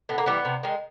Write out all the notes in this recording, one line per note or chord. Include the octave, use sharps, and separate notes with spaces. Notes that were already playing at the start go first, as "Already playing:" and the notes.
A2 B3
A#3
E3 G3 B3
C3
D#3 G#3